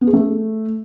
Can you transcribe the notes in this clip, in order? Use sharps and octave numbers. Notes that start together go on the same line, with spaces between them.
B3
G#4
A3